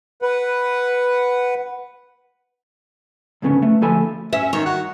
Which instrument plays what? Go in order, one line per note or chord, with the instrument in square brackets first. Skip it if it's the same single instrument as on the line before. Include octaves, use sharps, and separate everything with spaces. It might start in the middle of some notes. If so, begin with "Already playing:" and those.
[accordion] B4 F#5
[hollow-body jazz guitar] D2 G#2 C#3 A3 B3 C#4
A3 B4
D2 F3 A3 A4 G#5 B5
[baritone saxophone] C#4 [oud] E5
[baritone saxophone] D#3 [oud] C#5
[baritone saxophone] F#4